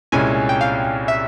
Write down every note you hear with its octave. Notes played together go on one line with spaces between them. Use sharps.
C2 A#2 G#3 C#4 E4 G#5
G5
F5
E5